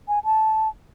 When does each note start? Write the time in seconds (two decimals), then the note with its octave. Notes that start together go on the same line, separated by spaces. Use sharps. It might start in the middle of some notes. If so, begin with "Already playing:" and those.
0.08 G#5
0.24 A5